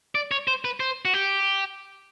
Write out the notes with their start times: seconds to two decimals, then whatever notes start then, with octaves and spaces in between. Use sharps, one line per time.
0.15 D5
0.31 C#5
0.48 C5
0.65 B4
0.80 C5
1.05 F#4
1.14 G4